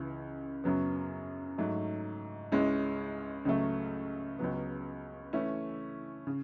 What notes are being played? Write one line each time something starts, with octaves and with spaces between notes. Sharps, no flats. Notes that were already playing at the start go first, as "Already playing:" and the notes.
Already playing: C#2 C#3 E3
F#2 C#3 F#3 B3
G#2 F#3 A3
C#2 C#3 G#3 C#4 E4
C#2 C#3 F#3 A3
C#2 C#3 F#3 B3
E3 A3 C#4 E4
C#3